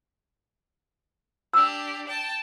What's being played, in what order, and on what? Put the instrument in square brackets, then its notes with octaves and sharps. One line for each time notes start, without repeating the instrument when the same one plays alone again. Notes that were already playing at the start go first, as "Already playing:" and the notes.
[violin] D4 G4 [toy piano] E6
[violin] G5 A5